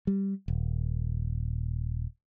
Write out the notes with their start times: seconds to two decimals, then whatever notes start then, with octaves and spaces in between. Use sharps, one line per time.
0.07 G3
0.48 D#1